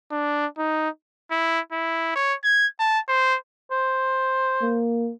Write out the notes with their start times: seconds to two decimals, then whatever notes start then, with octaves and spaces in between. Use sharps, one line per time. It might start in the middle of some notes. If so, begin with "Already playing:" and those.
0.11 D4
0.58 D#4
1.31 E4
1.72 E4
2.16 C#5
2.44 G#6
2.80 A5
3.08 C5
3.71 C5
4.61 A#3